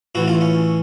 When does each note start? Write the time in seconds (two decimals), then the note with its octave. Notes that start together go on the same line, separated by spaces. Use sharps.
0.15 A2 E3 F#4
0.28 F4
0.41 C#4